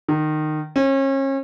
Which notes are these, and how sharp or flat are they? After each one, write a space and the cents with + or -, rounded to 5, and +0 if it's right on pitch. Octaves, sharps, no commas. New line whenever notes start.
D#3 -20
C#4 -35